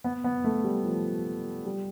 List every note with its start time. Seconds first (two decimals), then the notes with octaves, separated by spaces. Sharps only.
0.04 B3
0.24 B3
0.44 A3
0.64 G3
0.84 F3
1.66 G3